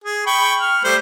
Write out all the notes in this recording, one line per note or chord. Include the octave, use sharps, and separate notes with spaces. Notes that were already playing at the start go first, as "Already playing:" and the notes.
G#4
G5 B5 C#6
F6
G3 A3 C5